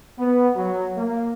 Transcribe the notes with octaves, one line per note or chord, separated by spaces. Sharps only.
B3
F#3
A#3